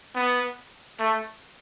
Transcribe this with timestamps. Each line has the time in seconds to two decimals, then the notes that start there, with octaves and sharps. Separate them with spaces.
0.15 B3
0.99 A3